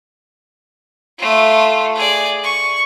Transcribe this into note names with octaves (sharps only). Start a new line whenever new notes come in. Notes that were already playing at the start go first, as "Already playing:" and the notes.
A3 F4
G#4 D5
C#6